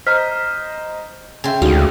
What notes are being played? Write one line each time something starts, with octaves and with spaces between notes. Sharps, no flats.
C5 D#5 A#5 F6 B6
C#3 E5 G5 G#5 C6
D2 G#3 D#4 F#4 F5 G5